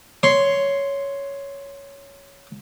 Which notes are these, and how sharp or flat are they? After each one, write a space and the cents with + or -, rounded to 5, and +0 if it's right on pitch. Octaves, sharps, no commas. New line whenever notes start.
C#5 +5 C6 +0